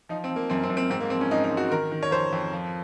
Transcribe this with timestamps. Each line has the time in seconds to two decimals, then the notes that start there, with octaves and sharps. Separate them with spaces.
0.09 F3 D#4
0.24 C4
0.30 F3
0.36 A#3
0.50 F#2 C4
0.64 C4
0.70 F#2
0.77 C4
0.90 G#2 C4
1.00 A#3
1.10 F3 C4
1.21 C#4
1.31 G#2 D#4
1.44 D#4
1.51 G#2
1.57 F#4
1.71 D#3 A#4
1.91 D#3
2.03 C#5
2.11 F2 C5
2.32 F2
2.53 F3